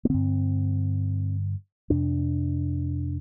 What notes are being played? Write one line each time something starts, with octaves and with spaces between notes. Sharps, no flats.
A#3
G2 D3 C4
F2 C3 D4